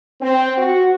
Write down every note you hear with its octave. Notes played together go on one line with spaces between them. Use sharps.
C4
F#4